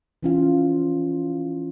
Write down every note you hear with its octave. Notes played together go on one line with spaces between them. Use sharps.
E3 C#4 F4